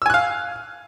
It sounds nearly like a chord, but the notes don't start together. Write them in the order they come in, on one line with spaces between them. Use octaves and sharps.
E6 G#5 F#6 F5